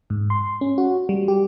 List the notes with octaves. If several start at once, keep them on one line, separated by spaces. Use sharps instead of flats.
G#2
C6
C#4
F#4
G3
G4